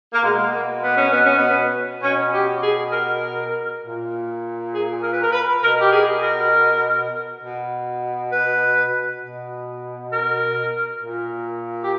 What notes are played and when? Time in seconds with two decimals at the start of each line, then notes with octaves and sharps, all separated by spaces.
0.14 A#3
0.23 B2 G#3
0.53 A#3
0.82 B3
0.97 C#4
1.11 B3
1.24 C#4
1.38 B3
2.03 B2 C#4
2.32 G4
2.63 G#4
2.93 A#4
3.83 A#2
4.72 G#4
5.02 A#4
5.12 B4
5.22 A#4
5.32 B4
5.62 B2 A#4
5.81 G4
5.92 G#4
6.21 A#4
7.42 B2
8.32 B4
9.21 B2
10.11 A#4
11.01 A#2
11.82 G4